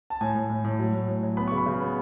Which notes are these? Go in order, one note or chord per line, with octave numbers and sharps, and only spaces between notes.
A5
A2 G#5
A2
A2
A2
F#3
A2
A2
F#3
B3 B5
C#3 C#6
B5
C#3
B3